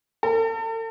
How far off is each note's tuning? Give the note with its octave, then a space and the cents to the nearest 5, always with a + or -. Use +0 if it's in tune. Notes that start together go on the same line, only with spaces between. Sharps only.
A4 +45